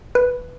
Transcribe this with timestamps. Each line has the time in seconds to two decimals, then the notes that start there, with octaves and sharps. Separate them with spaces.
0.15 B4